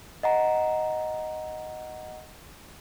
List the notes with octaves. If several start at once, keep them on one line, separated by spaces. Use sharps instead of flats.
D#5 F#5 A#5